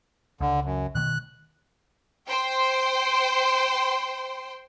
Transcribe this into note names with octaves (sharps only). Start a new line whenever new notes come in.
C#2 D3
F#2
B2 D#3 A3 F#6
C5 G5 C6